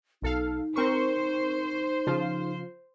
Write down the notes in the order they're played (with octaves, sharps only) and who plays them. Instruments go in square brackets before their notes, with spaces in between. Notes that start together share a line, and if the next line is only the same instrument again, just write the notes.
[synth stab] B1 A4 F5 [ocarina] D#4
[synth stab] C4 A#4 C#6 [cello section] C5
[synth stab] C#3 F3 F4